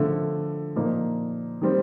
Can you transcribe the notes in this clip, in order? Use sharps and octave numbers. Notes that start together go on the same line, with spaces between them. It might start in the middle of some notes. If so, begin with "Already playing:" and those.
Already playing: D3 F3 A3
A#2 F3 A#3 D#4
D#3 G3 C4